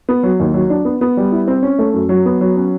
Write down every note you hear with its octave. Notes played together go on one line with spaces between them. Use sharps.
B3
F#3
D#2
F#3
D4
B3
B3
G3
E4
C4
C#4
A3
F#2
F#3
B3
F#3
C#4